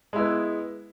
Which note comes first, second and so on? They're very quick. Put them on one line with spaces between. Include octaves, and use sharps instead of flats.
G#3 E4 B3